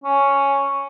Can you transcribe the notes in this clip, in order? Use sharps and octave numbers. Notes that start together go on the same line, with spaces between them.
C#4